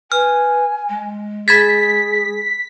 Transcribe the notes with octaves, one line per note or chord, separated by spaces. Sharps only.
B4 G#5 F6
G#3
G#4 B5 G#6 A6 B6